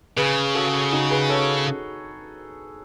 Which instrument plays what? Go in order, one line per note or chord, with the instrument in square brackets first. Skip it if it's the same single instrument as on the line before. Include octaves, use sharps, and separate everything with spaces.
[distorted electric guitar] C#3 [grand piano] G#4 B4
[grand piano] F#4 A4
D#4 F#4
G#4 B4
A4 C#5